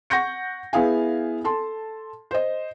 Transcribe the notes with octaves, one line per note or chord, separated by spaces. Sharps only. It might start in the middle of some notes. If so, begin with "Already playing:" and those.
F#5 C#6 G6 A#6 C#7
B3 E4 G#4 F5 G#5
A4 A5 C6
C5 D#5